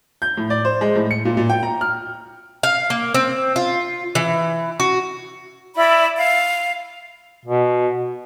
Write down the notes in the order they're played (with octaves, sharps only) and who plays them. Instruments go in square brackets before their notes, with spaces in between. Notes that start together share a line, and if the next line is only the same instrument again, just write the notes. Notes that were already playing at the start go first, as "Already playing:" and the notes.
[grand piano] G6
A2
D5
C5
G#3
A2
C#7
A#2
A#2
G5
A#5
F6
[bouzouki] F5
A#3
C4
F4
E3
F#4
[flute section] E4 D5 B5
F5
[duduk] B2